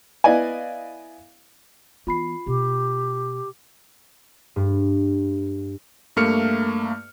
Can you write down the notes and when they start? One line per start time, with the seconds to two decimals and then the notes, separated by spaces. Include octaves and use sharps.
0.24 B3 E4 D5 D#5 F5 G#5
2.07 E3 B3 F4 B5 C7
2.47 B2 G4
4.56 G2
6.16 G2 A3 A#3 F6 C#7